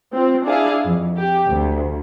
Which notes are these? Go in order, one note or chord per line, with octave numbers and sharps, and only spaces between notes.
C4 F4
D4 E4 G#4 F5
F2
G4
D2